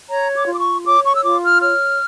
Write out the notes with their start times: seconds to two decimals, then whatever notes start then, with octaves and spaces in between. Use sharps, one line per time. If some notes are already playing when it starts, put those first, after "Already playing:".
0.10 C#5 A#5
0.35 D6
0.48 F4
0.54 D6
0.61 C#6
0.86 C#5 D6
1.05 C#6
1.15 E6
1.24 F4 D6
1.43 F6
1.63 C#5 F6